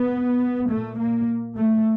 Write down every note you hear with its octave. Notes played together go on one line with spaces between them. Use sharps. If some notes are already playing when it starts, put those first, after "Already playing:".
Already playing: B3
A#2 A3
A#3
A3